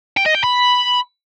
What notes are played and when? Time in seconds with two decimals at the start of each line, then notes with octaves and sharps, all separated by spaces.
0.17 G5
0.26 D#5
0.35 G5
0.44 B5